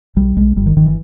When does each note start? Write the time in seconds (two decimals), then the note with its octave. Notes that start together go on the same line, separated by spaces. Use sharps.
0.16 B1 G3
0.36 B1 G#3
0.56 G1 G3
0.66 D#3
0.76 G1 D#3
0.86 E3